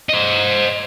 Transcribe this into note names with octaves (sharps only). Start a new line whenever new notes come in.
C5 D#5